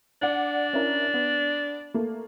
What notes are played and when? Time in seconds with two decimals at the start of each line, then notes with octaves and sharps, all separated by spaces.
0.22 D4 D5 F#5
0.73 C#4 E4 A#4
1.14 B3
1.94 A3 A#3